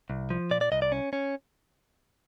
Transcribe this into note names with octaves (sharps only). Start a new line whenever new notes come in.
C2
F3
A#2 D5
D5
C2 D#5
D5
C#4
C#4